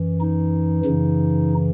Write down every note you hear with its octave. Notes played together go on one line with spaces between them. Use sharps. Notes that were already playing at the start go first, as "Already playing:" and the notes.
Already playing: F#2 E3
D#4
F#2 C#3 E3